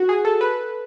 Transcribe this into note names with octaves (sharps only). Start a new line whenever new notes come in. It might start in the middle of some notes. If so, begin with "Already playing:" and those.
Already playing: F#4
G#4
A4
B4